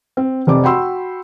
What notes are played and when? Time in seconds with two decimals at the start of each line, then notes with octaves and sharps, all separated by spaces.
0.17 C4
0.47 F1 C4 D5 D6
0.64 F#4 G5 B5 C6 E6